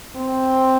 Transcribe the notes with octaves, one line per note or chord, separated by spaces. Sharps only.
C4